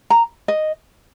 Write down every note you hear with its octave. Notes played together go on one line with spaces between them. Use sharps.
A#5
D#5